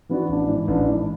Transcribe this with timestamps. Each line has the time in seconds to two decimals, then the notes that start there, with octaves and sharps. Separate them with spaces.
0.09 E3 B3 D4 F#4
0.29 A1 D4
0.48 G#2 E3
0.68 A1 D4
0.87 G#2 E3